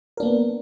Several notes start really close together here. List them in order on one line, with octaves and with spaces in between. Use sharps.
A#4 D4 A#3 B3